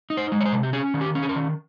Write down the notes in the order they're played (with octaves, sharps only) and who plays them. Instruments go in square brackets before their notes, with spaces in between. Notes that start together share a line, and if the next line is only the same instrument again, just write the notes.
[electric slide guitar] D#4
C5
G#3
C#5
C5
C3
G4
C#4 G#4
D#3
G4
C#4
G#4
A#4
D#3